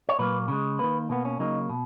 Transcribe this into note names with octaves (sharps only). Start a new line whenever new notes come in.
C#5
A#2 F#3 A#3 B4
C#3 G#3
D#3 A#3 B4
B2 A#3 B3
C#4
C#3 F#3 A#3 D#4
B2